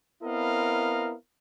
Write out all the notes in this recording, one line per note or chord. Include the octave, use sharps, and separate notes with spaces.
B3 C4 E4 A#4 D#5 F5